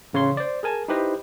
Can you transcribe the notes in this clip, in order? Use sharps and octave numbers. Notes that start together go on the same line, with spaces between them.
A1 C#3 C#5 C6
C5 D5
G#4 A#4 G#5 A5
D#4 E4 G4 B4 C5 D#5